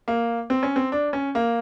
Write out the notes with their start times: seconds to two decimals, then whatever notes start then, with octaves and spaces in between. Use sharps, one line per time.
0.08 A#3
0.50 C4
0.63 C#4
0.76 C4
0.92 D4
1.13 C#4
1.35 A#3